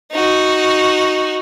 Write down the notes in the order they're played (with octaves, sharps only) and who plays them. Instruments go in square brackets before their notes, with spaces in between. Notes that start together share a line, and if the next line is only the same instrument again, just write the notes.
[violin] D#4 F#4